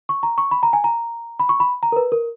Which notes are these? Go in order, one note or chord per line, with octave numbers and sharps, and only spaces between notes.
C#6
A#5
C#6
B5
A#5
G#5
A#5
B5
C#6
B5
A#5
A#4
B4
A#4